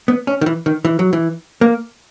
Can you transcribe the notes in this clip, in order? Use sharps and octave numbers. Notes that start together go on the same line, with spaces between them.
B3
C#4
D#3
E3
D#3
E3
F#3
E3
A#3